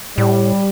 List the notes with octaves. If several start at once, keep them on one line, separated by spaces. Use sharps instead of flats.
A2 G3